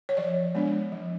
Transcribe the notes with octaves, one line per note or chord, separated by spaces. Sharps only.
C#5
F3 D5
G#3 B3 D4
F3